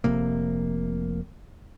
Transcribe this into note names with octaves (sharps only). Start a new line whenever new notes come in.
F1 F2 C3 A#3